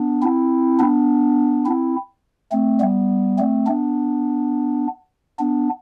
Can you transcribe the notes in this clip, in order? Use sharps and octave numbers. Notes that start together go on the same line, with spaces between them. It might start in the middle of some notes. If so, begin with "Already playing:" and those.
Already playing: B3 D4
C4 E4
B3 D4
C4 E4
A3 C4
G3 B3
A3 C4
B3 D4
B3 D4